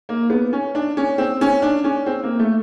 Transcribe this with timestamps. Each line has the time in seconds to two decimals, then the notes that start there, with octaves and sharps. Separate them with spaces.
0.09 A#3
0.30 B3
0.53 C#4
0.75 D4
0.97 C#4
1.18 C4
1.41 C#4
1.62 D4
1.84 C#4
2.06 C4
2.24 A#3
2.39 A3